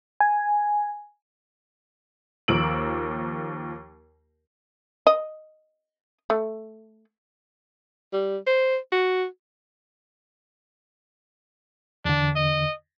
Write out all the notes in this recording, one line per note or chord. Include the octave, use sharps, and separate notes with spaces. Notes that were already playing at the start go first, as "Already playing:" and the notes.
G#5
D#2 F3 A#3 E6 D7 F#7
D#5
A3
G3
C5
F#4
E2 D3 D4
D#5